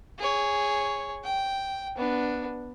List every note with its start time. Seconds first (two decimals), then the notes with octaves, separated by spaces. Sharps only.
0.18 G#4 C#5
1.23 G5
1.97 B3 D4